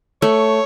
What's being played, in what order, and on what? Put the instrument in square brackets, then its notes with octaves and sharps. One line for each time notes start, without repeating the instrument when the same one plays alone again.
[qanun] A3 [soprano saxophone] C#5